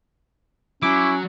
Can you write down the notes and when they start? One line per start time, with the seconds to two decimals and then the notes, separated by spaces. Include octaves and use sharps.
0.83 F#3 C#4 E4 D6